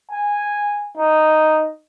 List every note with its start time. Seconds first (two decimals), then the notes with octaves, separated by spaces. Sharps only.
0.11 G#5
0.97 D#4